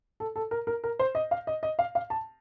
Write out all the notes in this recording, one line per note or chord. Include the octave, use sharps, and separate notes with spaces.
A4
A4
A#4
A#4
A#4
C5
D#5
F5
D#5
D#5
F5
F5
A5